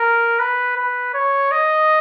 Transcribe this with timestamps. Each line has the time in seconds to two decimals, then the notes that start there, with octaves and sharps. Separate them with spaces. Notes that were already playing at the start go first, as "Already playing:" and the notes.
Already playing: A#4
0.39 B4
0.77 B4
1.14 C#5
1.52 D#5